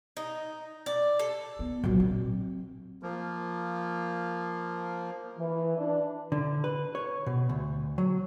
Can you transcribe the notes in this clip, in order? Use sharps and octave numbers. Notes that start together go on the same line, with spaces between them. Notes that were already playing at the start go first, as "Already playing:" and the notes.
D#4
D5
A4
B3
A#1 F#3
C4
F3 A#3
E3
D4
D3
B4
C#5
B2
D2
F#3